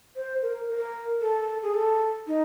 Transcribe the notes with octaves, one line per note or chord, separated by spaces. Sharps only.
C5
A#4
A#4
A4
G#4
A4
D#4